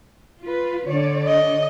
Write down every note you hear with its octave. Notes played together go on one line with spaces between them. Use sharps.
F4 B4
D3 C#5 D5
D#5